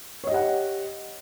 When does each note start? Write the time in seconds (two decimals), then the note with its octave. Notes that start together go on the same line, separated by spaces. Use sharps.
0.24 C#5
0.27 D#5
0.31 G4
0.34 F#5